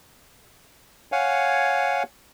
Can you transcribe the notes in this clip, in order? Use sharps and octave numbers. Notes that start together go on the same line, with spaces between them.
C#5 F5 F#5 G#5